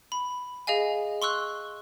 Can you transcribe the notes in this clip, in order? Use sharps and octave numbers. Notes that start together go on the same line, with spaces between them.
B5
G#4 D#5 F5 G#5
C6 C#6 E6 F#6